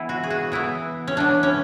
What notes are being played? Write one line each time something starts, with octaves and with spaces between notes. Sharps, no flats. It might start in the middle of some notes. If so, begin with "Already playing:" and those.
Already playing: E3 B3 E4
F#4
G#4
F#4
E3 B3 E4
C#4
E3 B3 D4
C#4